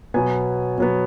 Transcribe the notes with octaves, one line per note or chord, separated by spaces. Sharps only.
B2 F#3 B3 G#5
B2 F#3 B3